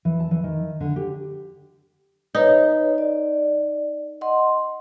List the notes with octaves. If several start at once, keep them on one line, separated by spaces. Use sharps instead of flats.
E3
A5
E3
D#3
D3
G4
D#4 B4 C#5
D5
D#5 F#5 C6